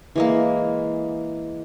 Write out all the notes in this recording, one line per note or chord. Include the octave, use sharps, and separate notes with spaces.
E3 G#3 A#3